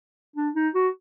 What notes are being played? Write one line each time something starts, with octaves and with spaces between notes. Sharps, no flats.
D4
D#4
F#4